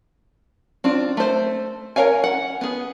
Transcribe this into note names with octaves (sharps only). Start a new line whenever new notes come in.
C4 D4 F4
A3 C5
A#4 B4 C#5 F5 G#5
F#5
B3 G#4